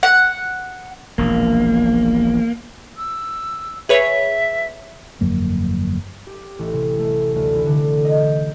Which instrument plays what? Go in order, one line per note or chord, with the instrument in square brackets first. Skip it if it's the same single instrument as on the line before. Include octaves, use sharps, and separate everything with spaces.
[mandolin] F#5
[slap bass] E1 A#1 [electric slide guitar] A#3
[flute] E6
[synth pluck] G#4 B4 C#5 [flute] E5
[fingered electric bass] G1 F2 F#3 A#3
[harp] G4
A1
C3
A3
D2
E3
D3
D#5
G6